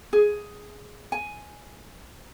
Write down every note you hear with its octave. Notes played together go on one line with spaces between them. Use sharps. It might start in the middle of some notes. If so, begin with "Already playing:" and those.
G#4
G#5